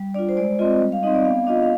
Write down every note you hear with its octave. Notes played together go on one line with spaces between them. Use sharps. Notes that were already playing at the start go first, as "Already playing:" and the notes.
Already playing: G3
D4 F4 D5
C5
G#3 D5
C4 F4 D#5
G3
F5
C4 D#4 D#5
D5
B3 F5
D4 F4 D#5
F5